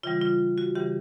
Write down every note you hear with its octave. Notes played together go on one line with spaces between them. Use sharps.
C#3 E3 G3 F4
F4
F#4
C#3 E3 G3 G4